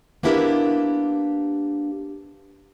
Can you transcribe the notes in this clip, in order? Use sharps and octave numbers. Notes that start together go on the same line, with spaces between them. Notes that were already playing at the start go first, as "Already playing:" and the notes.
A#3 B3 D4 E4 G4 A#4